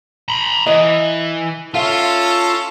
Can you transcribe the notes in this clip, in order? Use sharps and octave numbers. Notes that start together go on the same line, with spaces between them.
A#5 B5
E3 D#5
C#4 F4 A4 E5 F5